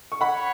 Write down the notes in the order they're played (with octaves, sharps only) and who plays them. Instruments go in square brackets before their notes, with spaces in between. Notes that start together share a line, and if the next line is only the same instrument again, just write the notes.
[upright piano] C#6
[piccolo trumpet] C#5 [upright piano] F#5 B5